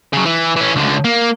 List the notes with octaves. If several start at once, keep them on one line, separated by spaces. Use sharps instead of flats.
C#3 F#3
E3
E3 C#4
C#2 D3
A#3